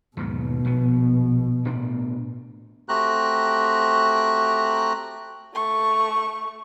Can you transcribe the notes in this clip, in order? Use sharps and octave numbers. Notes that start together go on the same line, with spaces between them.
D#2 G#2 B2 F#3
A#1 B3
A2 B3 D4
A3 C4 F#4 G4 A#5 F#6
A3 C#6